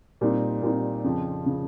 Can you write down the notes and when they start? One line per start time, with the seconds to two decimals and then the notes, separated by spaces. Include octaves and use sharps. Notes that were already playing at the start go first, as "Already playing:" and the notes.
0.21 A#2 G3 C4 D#4
0.62 A#2 G3 C4 D#4
1.04 F2 C#3 F3
1.46 C#3 F3